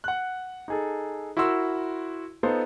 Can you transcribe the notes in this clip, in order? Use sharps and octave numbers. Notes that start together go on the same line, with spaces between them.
F#5 F#6
D#4 G#4 A4
E4 F#4 A#4 C6 E6
B3 D#4 F4 A4 C5